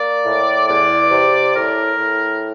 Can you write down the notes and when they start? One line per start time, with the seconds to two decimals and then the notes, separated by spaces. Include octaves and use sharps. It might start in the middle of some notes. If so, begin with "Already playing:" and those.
Already playing: A#3 D5
0.24 A2
0.67 E2 D5
1.11 C3
1.54 A2 A#4
1.96 A2